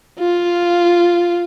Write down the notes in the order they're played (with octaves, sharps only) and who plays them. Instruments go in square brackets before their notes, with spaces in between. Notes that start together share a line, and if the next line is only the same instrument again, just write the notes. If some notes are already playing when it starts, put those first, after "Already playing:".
[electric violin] F4